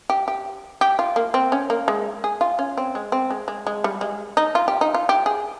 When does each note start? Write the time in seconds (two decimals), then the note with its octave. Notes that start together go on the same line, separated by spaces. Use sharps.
0.10 G4
0.28 G4
0.81 G4
0.99 F4
1.16 A#3
1.34 C4
1.52 C#4
1.70 A#3
1.88 G#3
2.24 G#4
2.41 F4
2.59 C#4
2.77 C4
2.95 G#3
3.12 C4
3.30 G#3
3.48 G#3
3.67 G#3
3.84 G3
4.01 G#3
4.37 D#4
4.55 F4
4.68 G4
4.81 D#4
4.94 F4
5.09 G4
5.26 G#4